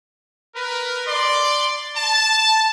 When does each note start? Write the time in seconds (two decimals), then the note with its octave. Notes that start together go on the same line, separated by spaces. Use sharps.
0.55 A#4 B4
1.07 D5 C6
1.96 A5